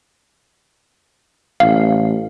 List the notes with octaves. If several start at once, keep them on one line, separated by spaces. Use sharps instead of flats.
A1 F5